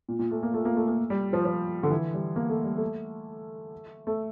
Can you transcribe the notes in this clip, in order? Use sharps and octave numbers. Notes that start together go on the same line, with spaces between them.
A#2
A#2
A3
A#3
A3
A#3
A3
A#3
G3
F3
F3
D3
E3
G3
A#3
A3
G3
A3
A3